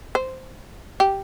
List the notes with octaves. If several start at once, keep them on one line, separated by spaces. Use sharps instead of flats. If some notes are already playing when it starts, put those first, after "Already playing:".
C5
G4